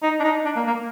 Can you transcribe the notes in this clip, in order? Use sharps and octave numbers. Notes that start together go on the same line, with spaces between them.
D#4
D4
D#4
D4
A#3
A#3